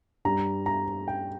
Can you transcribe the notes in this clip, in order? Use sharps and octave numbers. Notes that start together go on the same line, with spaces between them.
G2 G3 A#5
A#5
G5